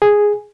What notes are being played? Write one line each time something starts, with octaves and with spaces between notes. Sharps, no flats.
G#4